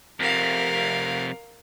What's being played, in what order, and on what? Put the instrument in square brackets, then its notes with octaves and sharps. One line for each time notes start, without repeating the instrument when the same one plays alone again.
[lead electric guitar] F2 C3 [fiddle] A#4 F5